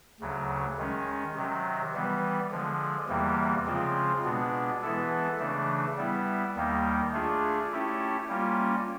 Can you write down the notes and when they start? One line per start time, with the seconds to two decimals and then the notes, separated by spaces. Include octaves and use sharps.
0.20 D2 C#3 F#3
0.78 D#3 G#3 C#4
1.36 C3 D#3 F#3
1.94 E3 G3 B3
2.51 D3 F3 G#3
3.09 E2 C3 E3 G3 A#3
3.67 C#3 F3 G#3 C4 F4
4.24 B2 G#3 B3 D4
4.82 E3 G#3 B3 E4 A4
5.39 C#3 E3 A3 D4
5.97 G3 B3 E4
6.55 D#2 D#3 G3 A#3 D#4
7.13 A3 D4 F4 G#4
7.71 A3 C#4 E4 G4
8.29 G3 A#3 C#4 F4